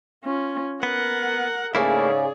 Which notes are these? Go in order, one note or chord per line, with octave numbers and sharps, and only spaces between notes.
C#4 F4
B3 A#4 F#5
G#2 C#3 A3 A#3 E4 G#4 D5